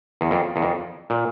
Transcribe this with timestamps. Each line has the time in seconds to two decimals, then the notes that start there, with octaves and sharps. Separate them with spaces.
0.21 E2
0.31 F2
0.56 E2
0.62 F2
1.10 A#2